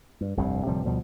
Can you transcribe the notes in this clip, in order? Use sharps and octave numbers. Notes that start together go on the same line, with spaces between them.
G2
F1 C2 G2 C3
D1 C3 F3 G3
D2 B2 F3 G3